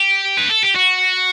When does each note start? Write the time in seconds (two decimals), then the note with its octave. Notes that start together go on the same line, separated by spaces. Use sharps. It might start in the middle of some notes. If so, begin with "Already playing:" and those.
Already playing: G4
0.37 B4
0.50 A4
0.63 G4
0.76 F#4